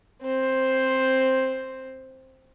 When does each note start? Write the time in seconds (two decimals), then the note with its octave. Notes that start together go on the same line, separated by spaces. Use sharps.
0.23 C4 C5